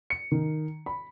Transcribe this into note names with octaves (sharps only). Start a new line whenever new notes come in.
C#7
D#3
B5